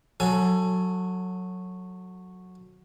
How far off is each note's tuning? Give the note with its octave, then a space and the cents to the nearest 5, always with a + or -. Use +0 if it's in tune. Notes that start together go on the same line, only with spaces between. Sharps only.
F#3 -10 A4 +15 G#5 +15